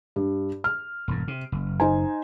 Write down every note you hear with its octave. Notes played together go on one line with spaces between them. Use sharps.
G2
F6
E1 G2
C3
F#1
D#4 C5 G#5